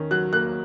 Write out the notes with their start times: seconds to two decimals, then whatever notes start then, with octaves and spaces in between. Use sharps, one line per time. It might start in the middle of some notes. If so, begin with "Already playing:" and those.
Already playing: D#3 C#4
0.11 F#3 F#6
0.33 A#3 F#6